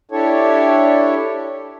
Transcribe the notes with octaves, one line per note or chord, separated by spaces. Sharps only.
D4 E4 G4 A4 C#5